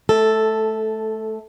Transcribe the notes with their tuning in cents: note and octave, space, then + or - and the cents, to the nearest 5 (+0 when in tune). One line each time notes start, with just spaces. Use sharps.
A3 -20 A4 +0